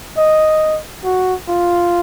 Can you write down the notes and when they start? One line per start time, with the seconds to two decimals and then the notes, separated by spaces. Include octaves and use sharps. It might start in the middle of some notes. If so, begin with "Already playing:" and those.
0.18 D#5
1.04 F#4
1.48 F4